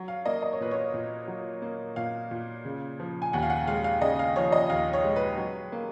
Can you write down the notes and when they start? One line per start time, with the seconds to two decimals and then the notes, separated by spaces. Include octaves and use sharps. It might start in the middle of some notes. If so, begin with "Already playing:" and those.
Already playing: F#3
0.08 F5
0.26 A#3 D#5
0.42 D#5
0.52 C#5
0.60 A#2 B4
0.71 C#5
0.94 A#2
1.28 F#3
1.62 A#3
1.96 A#2 F5
2.31 A#2
2.65 C#3
3.00 F3
3.22 G#5
3.33 D#2 F#5
3.42 F5
3.50 F#5
3.68 G#3 F5
3.84 F5
4.01 C#3 D#5
4.19 F5
4.36 F3 C#5
4.52 D#5
4.69 D#2 F5
4.93 C#5
5.05 G#3
5.16 B4
5.38 F#3
5.72 A#3